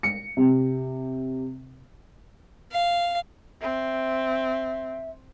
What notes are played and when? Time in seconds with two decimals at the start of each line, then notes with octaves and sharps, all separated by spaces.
0.03 C#7
0.37 C3
2.72 F5
3.62 C4 E5